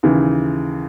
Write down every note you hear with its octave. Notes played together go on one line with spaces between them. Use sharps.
D#2 C#3 E3